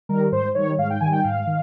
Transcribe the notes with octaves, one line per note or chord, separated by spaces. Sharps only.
D#3 G3 A#4
G#2 C5
D#3 G3 C#5
G#2 F5
G5
D#3 G3 G#5
G5
G#2 F5
D#3